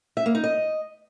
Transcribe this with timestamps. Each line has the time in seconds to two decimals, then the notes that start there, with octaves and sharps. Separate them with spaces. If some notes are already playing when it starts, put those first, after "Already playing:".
0.17 E5
0.26 A#3
0.35 D#4
0.44 D#5